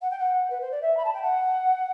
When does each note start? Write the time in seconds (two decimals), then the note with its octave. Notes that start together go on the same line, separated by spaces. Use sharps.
0.01 F#5
0.10 G5
0.19 F#5
0.50 B4
0.61 C5
0.71 D5
0.82 E5
0.97 B5
1.05 A5
1.13 G5
1.22 F#5